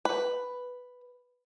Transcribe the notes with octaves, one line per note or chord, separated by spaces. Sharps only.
B4